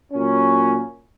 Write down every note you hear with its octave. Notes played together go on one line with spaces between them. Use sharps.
A#2 F#3 C#4